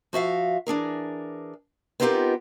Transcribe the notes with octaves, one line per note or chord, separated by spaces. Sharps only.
F3 F#4 E5 F5
E3 D4 G#4 A#4
B3 C4 D#4 F4 G4 A#4